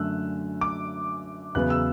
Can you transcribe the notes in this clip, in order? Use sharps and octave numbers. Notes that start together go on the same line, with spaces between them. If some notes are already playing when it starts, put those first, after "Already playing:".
Already playing: F#2 D3 A3 E6 F#6
D6
E2 C#3 F#3 B3 F#6
E6